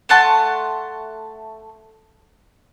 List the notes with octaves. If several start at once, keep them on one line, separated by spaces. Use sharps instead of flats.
A3 F#5 A5 C6